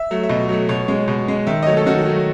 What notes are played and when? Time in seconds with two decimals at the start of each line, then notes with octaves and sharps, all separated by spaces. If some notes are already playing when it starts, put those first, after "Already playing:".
Already playing: E5
0.11 F#3 A3
0.23 E5
0.29 B2 D#5
0.49 F#3 A3
0.69 B2 C#5
0.88 G#3
1.08 B2
1.28 G#3
1.47 D#3 E5
1.62 D#5
1.66 F#3 A3 C#5
1.77 A4
1.86 D#3 F#4
2.06 F#3 A3